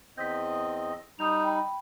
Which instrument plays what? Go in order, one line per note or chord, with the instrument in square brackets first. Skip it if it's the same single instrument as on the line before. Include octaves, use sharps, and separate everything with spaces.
[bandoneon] E2 C4 D#5 [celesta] G6 A#6 B6
[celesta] D#6
[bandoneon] G3 D#4 [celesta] D#6 G6 F7
[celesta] G5 B5